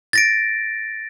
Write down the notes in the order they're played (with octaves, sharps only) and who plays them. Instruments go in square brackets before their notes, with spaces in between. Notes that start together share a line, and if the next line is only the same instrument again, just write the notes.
[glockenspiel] A6 A#6 D7